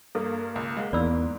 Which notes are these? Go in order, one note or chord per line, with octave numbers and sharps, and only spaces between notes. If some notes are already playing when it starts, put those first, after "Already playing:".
G2 A#3 A4
C#2
G#3 F5 F#5
E2 G#2 D5 B5 E6